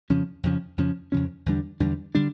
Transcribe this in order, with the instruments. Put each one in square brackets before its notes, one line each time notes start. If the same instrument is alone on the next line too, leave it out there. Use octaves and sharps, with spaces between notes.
[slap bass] F2 C#3 F3 C#4
F2 C#3 F3 C#4
F2 C#3 F3 C#4
F2 C#3 F3 C#4
E2 D3 G3 D4
E2 D3 G3 D4
D3 G3 D4